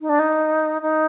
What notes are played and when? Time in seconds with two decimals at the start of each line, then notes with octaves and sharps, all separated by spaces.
0.01 D#4
0.09 D4
0.19 D#4
0.81 D#4